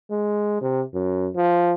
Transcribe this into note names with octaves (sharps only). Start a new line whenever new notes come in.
G#3
C3
F#2
F3